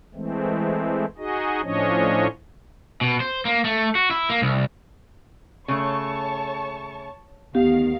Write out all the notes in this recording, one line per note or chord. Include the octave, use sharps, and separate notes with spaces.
E3 G#3 A3 C4
D#4 F#4 G#4 D#5
A2 F3 C#4 D4 C#5 D#5
B2
C5
A#3
A3
F#4
E4
A#3
C2
C#3 A3 C#5 A5 C#6
D2 D#3 B3 G4 F5